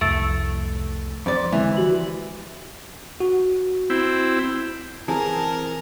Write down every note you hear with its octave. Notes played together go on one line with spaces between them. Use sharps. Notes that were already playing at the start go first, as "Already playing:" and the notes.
C2 F2 A3 E6 A6 D7
F2 C5 D5
D3 E3 F3 G#3
F#4 G4 F#7
F#4
C4 E4
E3 C4 G#4 A#4 A5